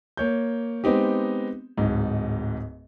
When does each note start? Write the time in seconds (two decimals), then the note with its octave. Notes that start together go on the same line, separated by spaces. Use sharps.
0.17 A#3 C#5 G6
0.84 G#3 B3 C4 D#4 G4
1.77 D1 G#2 D#4